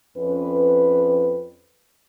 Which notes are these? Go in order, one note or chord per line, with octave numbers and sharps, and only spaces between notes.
F2 C#4 B4